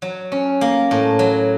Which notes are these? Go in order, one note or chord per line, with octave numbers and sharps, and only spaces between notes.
F#3
C#4
A#3
A2
F#3